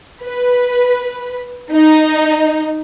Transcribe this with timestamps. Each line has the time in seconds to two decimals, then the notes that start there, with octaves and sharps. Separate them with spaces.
0.23 B4
1.71 D#4